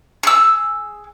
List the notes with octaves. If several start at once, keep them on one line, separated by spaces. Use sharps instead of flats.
G#4 E6